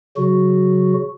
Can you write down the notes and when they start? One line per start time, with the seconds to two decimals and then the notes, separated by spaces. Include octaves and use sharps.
0.17 C#3 F#3 F#4